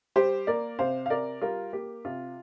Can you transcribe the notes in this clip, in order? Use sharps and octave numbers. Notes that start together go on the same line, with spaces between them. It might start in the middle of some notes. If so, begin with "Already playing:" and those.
G3 G4 C5
A#3 A#4 D5
C3 C5 F5
F5
C3 A#4 D5
G3 F4 A#4
A#3 G4
C3 F4